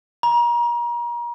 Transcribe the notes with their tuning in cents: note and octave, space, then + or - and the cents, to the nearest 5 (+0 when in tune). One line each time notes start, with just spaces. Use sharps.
A#5 +35